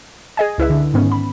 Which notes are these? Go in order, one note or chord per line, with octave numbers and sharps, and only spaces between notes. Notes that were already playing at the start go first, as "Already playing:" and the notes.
G#4 D#5 G#5
C#2 E4 B4 E5
D3
G#2 D#3 B3 C#4
B5